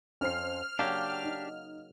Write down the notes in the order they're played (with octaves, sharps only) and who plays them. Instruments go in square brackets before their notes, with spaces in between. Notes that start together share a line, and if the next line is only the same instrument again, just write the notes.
[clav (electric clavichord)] F2 [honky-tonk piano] C#4 C5 C7 [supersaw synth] F6
[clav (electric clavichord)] C#3 F#3 A#3 [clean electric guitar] D4 G4 [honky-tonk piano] F5 G5
[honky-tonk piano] D#4